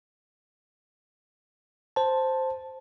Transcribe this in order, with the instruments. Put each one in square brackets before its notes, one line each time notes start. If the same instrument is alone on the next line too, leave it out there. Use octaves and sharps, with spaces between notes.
[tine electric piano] C5 A5